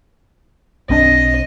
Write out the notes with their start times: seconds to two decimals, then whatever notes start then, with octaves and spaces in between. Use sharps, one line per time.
0.90 B1 C4 D4 D#5